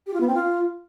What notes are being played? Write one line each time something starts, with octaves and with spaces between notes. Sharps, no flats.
G4
F4
B3
C4
F4